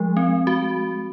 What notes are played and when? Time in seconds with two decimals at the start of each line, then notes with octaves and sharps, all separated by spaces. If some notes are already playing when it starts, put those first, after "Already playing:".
Already playing: F3 G#3
0.17 C4
0.47 F#4